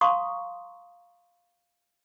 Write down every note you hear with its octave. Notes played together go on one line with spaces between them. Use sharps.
F5 A#5 C6 C#6 D#6